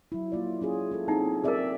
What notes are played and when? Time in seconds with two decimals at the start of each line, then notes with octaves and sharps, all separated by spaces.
0.12 F#3 E4
0.32 A#3 F4 D5
0.61 C#4 F4 G#4
0.92 E4 F4 A4
1.08 C4 D#4 E4 G#4 F#5
1.44 C4 G#4 A#4 D5 E5